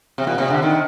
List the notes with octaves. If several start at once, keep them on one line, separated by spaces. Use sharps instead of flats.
C3
A#2
C3
D3
D#3